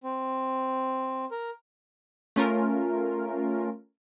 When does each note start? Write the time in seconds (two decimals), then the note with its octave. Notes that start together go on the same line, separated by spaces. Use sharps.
0.04 C4
1.31 A#4
2.36 A3 C#4 F4 A#4